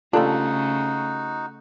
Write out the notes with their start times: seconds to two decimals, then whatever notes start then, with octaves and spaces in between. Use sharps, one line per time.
0.13 C#3 G3 A3 D4 D#4 F4 F#4 A4